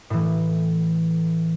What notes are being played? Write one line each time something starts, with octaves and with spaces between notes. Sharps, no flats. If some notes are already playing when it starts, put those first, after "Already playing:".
A2 E3